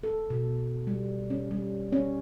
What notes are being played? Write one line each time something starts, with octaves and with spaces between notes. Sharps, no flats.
A4
B2
G3
C#4
G3
C#4